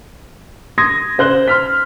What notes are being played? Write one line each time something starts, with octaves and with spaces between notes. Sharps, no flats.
C6 D#6 G#6 A#6
C#3 C5 F#6 G7
C6 F6 B6